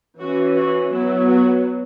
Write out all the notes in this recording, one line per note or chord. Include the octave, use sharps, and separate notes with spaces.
E3 C#4 F#4
F#4
F#3 B3 E4
F#4